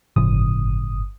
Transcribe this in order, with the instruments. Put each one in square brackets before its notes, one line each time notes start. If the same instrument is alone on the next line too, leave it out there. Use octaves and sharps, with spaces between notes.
[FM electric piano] G1 D#6 [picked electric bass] A2 C#3 F3